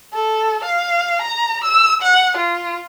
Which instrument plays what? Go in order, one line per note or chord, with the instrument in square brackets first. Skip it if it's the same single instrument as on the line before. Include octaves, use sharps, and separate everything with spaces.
[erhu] A4
F5
A#5
E6
F#5
F4